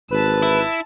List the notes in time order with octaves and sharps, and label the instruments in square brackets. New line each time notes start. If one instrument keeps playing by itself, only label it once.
[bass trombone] G#1 [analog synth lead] B4 [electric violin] A5 E6
[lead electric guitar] E4